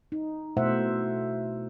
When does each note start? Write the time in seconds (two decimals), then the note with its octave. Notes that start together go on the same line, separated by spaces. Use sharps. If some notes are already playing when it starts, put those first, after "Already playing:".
0.12 D#4
0.57 B2 A3 E4 C5 E5 F#5